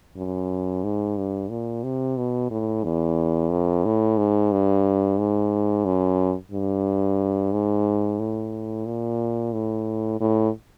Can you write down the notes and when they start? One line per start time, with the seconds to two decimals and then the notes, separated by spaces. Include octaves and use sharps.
0.17 F#2
0.84 G#2
1.17 G2
1.50 A#2
1.84 C3
2.17 B2
2.50 A2
2.84 E2
3.51 F2
3.85 A2
4.18 G#2
4.52 G2
5.18 G#2
5.85 F#2
6.52 G2
7.53 G#2
8.20 A2
8.86 A#2
9.53 A2
10.20 A2